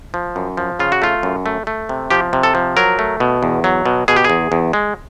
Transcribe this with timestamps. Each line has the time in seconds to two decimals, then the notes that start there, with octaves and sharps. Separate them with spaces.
0.14 F3
0.36 F#2
0.57 F3
0.79 C#3 F4
0.92 F#4
1.02 A3 F4
1.23 F#2
1.46 A3
1.67 A3
1.89 C3
2.11 F3 G4
2.33 C3
2.43 A4
2.55 F3
2.77 F#3 A#4
2.99 A3
3.20 B2
3.43 E2
3.64 F#3
3.86 B2
4.08 B2 G#4
4.16 G4
4.24 G#4
4.30 E2
4.52 E2
4.73 G#3